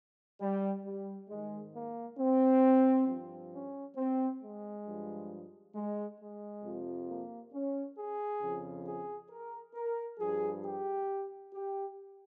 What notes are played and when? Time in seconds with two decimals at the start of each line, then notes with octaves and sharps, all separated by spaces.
0.41 G3
0.85 G3
1.29 G#2 D#3 G#3
1.73 A#3
2.18 C4
3.07 G2 F3
3.52 C#4
3.96 C4
4.41 G#3
4.85 G2 F3
5.75 G#3
6.18 G#3
6.63 F2 C3 F3
7.08 A#3
7.53 C#4
7.97 G#4
8.41 F2 C#3 F3
8.85 G#4
9.30 A#4
9.74 A#4
10.19 G2 F3 G#4
10.63 G4
11.53 G4